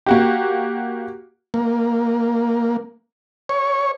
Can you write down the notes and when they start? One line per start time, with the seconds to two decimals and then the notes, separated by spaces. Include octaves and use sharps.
0.06 A#3 F#4 G4
1.54 A#3
3.49 C#5